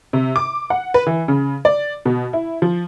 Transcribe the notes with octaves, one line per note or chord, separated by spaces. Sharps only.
C3
D6
F#5
B4
E3
C#3
D5
B2
E4
F3